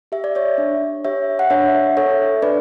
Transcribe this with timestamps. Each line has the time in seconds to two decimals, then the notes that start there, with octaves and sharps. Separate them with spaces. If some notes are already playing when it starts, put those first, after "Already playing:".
0.12 G4 E5
0.24 D5
0.35 C#5 E5
0.58 D4
1.04 G4 C#5 E5
1.39 F#5
1.50 D4 C#5 E5
1.97 A4 C#5 E5
2.42 D4 B4 D5